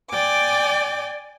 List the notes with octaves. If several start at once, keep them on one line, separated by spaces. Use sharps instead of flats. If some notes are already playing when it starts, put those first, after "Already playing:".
D5 G5 G#5 D6